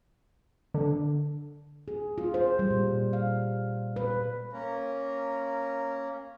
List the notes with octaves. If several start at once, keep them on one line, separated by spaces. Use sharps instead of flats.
D3
G#4
F4
C5
G3
A#2
F5
B4
A#3 C#4 A#4